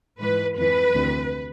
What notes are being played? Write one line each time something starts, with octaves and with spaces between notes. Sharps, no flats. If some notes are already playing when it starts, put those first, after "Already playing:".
G#2 E3 B4
F2 E3 B4
D2 C3 E3